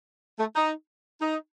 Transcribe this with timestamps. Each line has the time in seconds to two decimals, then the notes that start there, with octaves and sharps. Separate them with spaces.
0.39 A3
0.56 D#4
1.21 D#4